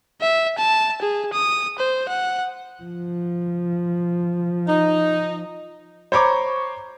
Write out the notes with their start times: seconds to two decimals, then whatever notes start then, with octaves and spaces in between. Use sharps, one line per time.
0.21 E5
0.58 A5
1.02 G#4
1.33 D#6
1.78 C5
2.08 F#5
2.83 F3
4.67 D#4
6.12 C5 C#5 A#5 B5 C#6 D6